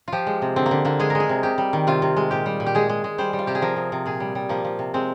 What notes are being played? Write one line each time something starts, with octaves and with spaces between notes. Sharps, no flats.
F3 F4 G4
G#3
C3
D3 C4
A#3
D3
D3 A#3
G#3 G#4
G#3 A#4
G#4
C3
C3 G4
G3
D#3
C3 F4
C3
G#3
A#2 G4
G3
A#2
G4
G#3 G#4
G#3
G#3
G3 C5
G3
F4
C3 G4
G#4
F3 A#4
C3
C3
A#2 G#4
G3
G3
F3 A#3
F3
C3
G#3 C4